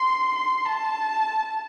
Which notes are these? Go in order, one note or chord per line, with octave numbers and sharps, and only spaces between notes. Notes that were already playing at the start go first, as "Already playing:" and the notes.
Already playing: C6
C6
A5